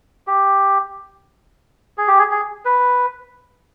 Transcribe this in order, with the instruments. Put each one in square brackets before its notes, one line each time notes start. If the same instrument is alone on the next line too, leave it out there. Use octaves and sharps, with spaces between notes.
[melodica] G4
G#4
G4
G#4
G#4
B4